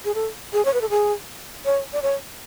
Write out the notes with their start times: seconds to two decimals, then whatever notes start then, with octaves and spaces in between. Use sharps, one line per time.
0.05 G#4
0.15 A4
0.53 G#4
0.65 C#5
0.74 B4
0.81 A4
0.90 G#4
1.65 C#5
1.93 D5
2.02 C#5